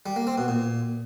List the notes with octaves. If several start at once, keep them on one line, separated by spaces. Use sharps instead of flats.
G3
A#3
C4
B2
A#2